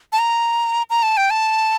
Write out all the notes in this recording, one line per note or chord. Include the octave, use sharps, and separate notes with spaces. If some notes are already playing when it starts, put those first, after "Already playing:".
A5
A#5
A#5
A5
G5
A5